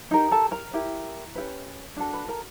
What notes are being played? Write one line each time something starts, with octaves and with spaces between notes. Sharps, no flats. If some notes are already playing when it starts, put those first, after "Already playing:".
D#4 G4 A#4
A4 A5
A#4 A#5
E4 G4 A#4
C#4 E4 G4 B4
D4 F#4 A4
B4 B5
A#4 A#5